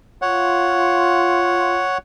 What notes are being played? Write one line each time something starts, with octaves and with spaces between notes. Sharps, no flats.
F4 C#5 F#5